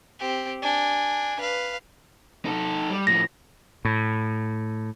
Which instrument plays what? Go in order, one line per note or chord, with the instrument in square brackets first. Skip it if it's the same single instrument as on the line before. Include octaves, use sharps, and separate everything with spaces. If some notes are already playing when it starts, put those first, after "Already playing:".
[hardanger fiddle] C4 G4
D4 G#5
B4 F5
[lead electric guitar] D#4 A4
G3
[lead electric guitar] A2 F3 [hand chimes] A#6
[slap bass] A2